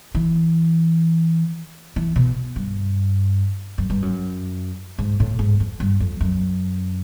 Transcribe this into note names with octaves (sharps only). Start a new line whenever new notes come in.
E3
E3
B2
G2
F#2
G2
F#2
G#2
A2
G#2
F2
G2
F2
F#2